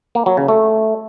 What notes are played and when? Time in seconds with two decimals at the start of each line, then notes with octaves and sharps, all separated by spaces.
0.15 A#3
0.26 F#3
0.37 C#3
0.48 A3